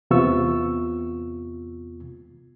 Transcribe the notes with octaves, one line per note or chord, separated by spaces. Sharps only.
E2 C3 B3 F4 C#6 E6